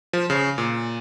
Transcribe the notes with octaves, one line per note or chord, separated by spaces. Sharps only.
F3
C#3
A#2